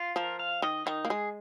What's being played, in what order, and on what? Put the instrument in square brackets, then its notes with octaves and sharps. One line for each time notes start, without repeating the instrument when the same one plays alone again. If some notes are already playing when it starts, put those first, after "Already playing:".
Already playing: [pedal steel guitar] F4
[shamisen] F3 [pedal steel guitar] A#4
[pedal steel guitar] F5
[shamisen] D#3 [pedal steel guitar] D#5
[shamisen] D#3 [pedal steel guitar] D#4
[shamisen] A#3
[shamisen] G#3 [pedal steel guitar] G#4